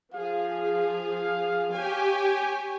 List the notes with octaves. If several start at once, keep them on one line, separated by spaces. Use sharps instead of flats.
F3 G#4 F5
G4 C#5 G#5